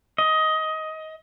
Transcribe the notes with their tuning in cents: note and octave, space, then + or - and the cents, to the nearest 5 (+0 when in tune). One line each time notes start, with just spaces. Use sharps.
D#5 +15